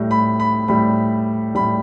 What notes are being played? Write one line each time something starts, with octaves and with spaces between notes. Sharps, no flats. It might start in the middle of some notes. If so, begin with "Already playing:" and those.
Already playing: A2 G3
B5
B5
A2 G3 B5
A2 G3 B5